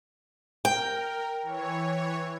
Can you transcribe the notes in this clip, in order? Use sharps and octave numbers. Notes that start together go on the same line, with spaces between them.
A#4 G5
E3 C#5